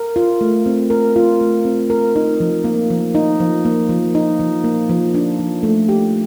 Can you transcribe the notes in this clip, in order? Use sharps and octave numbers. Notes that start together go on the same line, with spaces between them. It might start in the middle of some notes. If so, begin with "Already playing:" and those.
Already playing: A#4
F4
A3
C4
A#4
F4
A3
C4
A#4
D#4
F3
A#3
F3
D#4
F3
A#3
F3
D#4
F3
A#3
F3
D4
F3
A3
G4